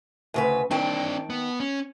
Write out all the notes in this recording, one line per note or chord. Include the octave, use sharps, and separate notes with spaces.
D2 C#3 B4
D#3 C4 D4 G5 A5
B3
C#4